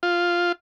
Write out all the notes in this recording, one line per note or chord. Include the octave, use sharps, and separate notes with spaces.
F4